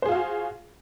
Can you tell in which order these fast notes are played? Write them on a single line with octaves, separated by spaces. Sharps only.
C5 G#4 F4 F5 F#4